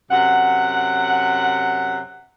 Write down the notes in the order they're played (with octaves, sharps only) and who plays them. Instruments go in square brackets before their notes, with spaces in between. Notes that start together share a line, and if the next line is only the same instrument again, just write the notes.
[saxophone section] F#2 C3 F#5